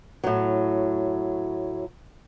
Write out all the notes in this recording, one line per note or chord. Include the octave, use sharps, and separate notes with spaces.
A2 F#3